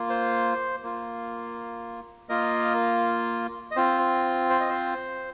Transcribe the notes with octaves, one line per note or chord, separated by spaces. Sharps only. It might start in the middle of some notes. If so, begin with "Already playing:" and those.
Already playing: A#3 F4
C5
A#3 F4
A#3 F4 A#4 D#5
D#5
C4 F4 C5
C5
D#5
C5